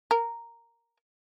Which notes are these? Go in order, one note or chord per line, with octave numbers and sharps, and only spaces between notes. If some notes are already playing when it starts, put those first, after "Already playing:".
A#4